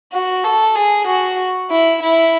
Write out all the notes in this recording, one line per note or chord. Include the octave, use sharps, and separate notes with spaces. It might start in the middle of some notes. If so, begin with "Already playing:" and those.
F#4
A4
G#4
F#4
E4
E4